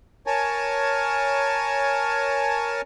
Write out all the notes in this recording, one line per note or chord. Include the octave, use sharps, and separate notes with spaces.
A#4 C#5 G#5 A5